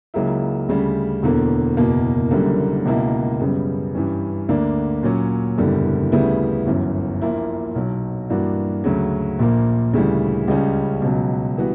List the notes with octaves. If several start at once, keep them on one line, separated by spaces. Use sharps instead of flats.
C#2 C#3 F#3 A#3 E4
D2 C#3 G3
E1 E2 D3 A#3
F#1 E2 B2 A#3
F#1 F#2 D3 G3 A#3
C#2 B2 A#3 E4
F#2 C#3 G3 B3
G2 E3 G3 C#4
D2 D3 A#3 D4
A#2 F#3 C#4
F#1 E2 D3 G3
D2 C#3 G3 B3 E4
G1 F#2 E3
A#1 A#2 A#3 E4
B1 B2 F#3
G2 E3 A#3 D4 F#4
D2 C#3 F#3
A#1 A#2 A#3
D2 C#3 E3 G3
C#2 C#3 G3 C#4
C#2 B2 F#3
E3 G3 B3 F#4